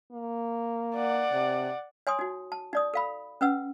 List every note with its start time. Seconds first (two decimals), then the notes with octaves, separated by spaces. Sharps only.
0.12 A#3
0.95 D5 F#5
1.32 C3
2.07 C#5 G#5 C6 D#6
2.19 D#4 F#4
2.52 A5
2.73 D#4 D5 D#6
2.94 A4 F5 B5
3.41 C#4 B4 F#5 E6